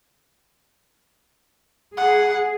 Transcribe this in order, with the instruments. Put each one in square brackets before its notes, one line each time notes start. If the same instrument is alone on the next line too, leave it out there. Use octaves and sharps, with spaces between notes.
[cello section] G#4 [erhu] F#5